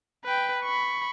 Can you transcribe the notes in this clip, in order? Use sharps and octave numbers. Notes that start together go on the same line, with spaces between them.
B4 G5
B5 C#6